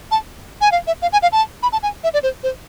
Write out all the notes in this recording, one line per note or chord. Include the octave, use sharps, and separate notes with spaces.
A5
G#5
F5
E5
F5
G#5
F5
A5
B5
A5
G#5
E5
D5
C5
C5